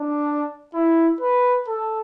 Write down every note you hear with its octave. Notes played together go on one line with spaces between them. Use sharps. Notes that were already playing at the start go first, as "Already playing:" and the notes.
Already playing: D4
E4
B4
A4